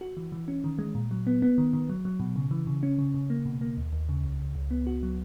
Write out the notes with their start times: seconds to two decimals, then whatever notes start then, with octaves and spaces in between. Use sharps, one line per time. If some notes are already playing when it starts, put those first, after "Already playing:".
0.01 F#4
0.17 E3
0.32 E3
0.48 C#4
0.64 D#3
0.79 G#3
0.95 A#2
1.11 F#3
1.27 B3
1.42 B3
1.58 D#3
1.73 D#3
1.89 F#3
2.05 F#3
2.20 B2
2.36 C#3
2.51 E3
2.67 C#3
2.83 C#4
2.99 C#3
3.14 C#3
3.30 A#3
3.45 B2
3.61 A#3
3.77 D#2
3.93 D#2
4.09 C#3
4.24 C#2
4.40 C#2
4.55 C#2
4.71 B3
4.87 F#4
5.03 F#3